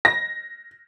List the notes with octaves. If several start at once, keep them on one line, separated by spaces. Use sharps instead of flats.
A#6